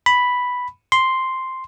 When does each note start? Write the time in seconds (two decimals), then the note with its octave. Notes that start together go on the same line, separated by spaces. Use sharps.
0.06 B5
0.92 C6